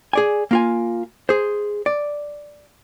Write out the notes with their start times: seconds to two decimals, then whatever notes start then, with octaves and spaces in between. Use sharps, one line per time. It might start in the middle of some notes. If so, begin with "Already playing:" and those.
0.13 G#4 D5 G#5
0.51 A#3 F4 G#5
1.29 G#4 C5
1.86 D5